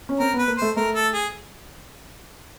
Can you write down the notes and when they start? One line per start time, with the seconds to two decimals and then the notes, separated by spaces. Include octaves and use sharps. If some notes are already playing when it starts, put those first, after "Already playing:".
0.09 C#4
0.20 C4 A#4
0.33 B3
0.39 B4
0.48 A#3
0.57 A3 C5
0.76 A3 A#4
0.95 A4
1.13 G#4